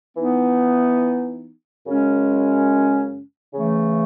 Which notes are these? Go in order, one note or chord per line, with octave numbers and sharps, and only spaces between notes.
E3 B3 D#4
F#2 C#3 G#3 C#4
C#3 E3 A3